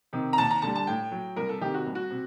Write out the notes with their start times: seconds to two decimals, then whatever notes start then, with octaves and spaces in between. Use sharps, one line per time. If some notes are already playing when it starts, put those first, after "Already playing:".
0.13 C3 D#3
0.33 A#5
0.38 D#2 A5
0.51 A#5
0.62 D3 G3 A5
0.76 A5
0.87 A2 G5
1.11 F#3
1.36 C2 A#4
1.49 A4
1.61 C3 D#3 G4
1.74 F#4
1.87 C2
1.95 F#4
2.11 C3